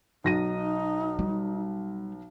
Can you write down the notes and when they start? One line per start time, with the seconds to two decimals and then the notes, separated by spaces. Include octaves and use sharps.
0.24 B1 D#4 A#6 D#7
1.19 G3